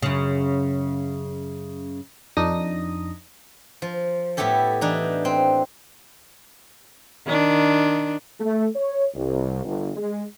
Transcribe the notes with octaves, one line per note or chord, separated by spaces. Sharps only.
F#2 C#3
F2 D4 D#4 D#6 A#6
F3
A2 B3 E4 G4 A4
E3 D4 D#4
C4
D#3 D4
A3
C#5
C2
G1
G#3